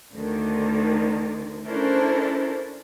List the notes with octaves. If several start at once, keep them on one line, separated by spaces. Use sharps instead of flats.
D2 D3 D#3
C#4 D4 E4 A4 A#4 C5